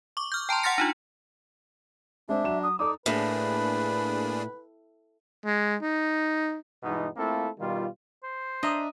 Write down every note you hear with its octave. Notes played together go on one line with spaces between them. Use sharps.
C#6 D6
F6 G6
G5 A5 A#5 C6
F#5 C6 F6 A6 A#6 C#7
D4 D#4 F4
G#3 C4 D4 E5
F#3 E7
D#6
D#4 A4 D5 D6 D#6
A2 A#3 D4 G#4 B4
G#3
D#4
G2 B2 E3 G#3 B3 D#4
A3 A#3 C4 E4 F4 A4
B2 D#3 G3 F4
C5
D4 D#5 E5 A#5